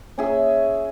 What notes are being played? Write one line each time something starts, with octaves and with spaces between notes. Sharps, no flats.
C#4 G#4 E5